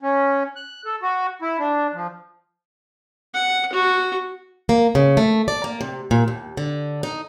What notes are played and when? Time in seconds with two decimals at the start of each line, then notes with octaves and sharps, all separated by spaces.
0.02 C#4
0.56 F#6
0.85 A4
1.02 F#4
1.42 E4
1.59 D4
1.94 F3
3.34 F#5
3.73 F#4
4.69 A#3
4.95 C#3
5.17 A3
5.48 D5
5.64 A#3
5.81 C3
6.11 A#2
6.28 D#2
6.57 D3
7.03 D#4